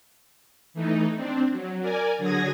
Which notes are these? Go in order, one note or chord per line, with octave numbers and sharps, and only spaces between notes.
E3 A3 D#4
C4 D4
F#3
A#4 D5 G#5
D3 F#3 G#4 D#6 G#6 A#6